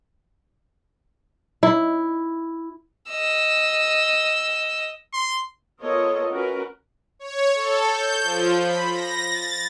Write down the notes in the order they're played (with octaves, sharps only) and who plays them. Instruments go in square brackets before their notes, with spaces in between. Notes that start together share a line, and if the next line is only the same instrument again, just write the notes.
[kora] E4
[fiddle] D#5 E6
[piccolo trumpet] C6
[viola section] B3 F4 A4 A#4 C#5 D#5
C#4 F#4 A#4 B4
[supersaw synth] C#5
A4
G6
F3
B5
A#6
A6